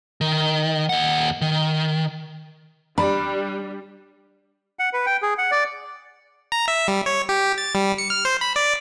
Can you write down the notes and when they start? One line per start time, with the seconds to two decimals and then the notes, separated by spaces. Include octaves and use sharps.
0.21 D#3
0.89 D#2 F#5
1.41 D#3
2.98 G3 D4 B5
4.79 F#5
4.93 B4
5.06 G5
5.22 G#4
5.38 F#5
5.51 D5
6.52 A#5
6.68 E5
6.88 G3
7.06 C#5
7.29 G4
7.58 A6
7.75 G3
7.98 C#7
8.10 F6
8.25 C5
8.41 B5
8.56 D5